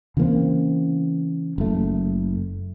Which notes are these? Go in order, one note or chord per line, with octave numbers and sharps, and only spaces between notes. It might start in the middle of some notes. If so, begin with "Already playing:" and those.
C#3 E3 A#3 C4
F#1 A3